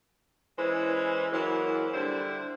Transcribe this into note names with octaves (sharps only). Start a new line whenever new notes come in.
E3 G#3 C#4 B4 C5
E3 F#3 G#3 A#3 C5
D3 G3 E4 C5